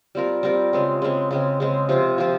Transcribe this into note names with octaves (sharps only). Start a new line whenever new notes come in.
G3 C4 F4 A#4
G3 C4 F4 A#4
C#3 G#3 C4
C#3 G#3 C4
C#3 G#3 C4
C#3 G#3 C4
C3 F3 C4 F4
C3 F3 C4 F4